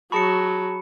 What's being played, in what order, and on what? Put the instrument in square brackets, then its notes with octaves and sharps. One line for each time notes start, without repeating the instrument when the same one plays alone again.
[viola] F#3 [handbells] G#4 A5 C#6 [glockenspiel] B5 C#7